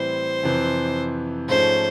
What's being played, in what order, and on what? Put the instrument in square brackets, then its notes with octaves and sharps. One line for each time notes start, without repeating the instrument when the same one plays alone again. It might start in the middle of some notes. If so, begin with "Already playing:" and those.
Already playing: [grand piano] A2 E3 G3 C4 E4 [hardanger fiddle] C5
[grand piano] F2 C3 E3
[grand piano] G#2 F3 A3 C#4 [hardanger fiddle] C5